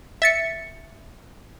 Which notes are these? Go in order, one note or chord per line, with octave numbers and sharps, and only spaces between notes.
E5 A6 C#7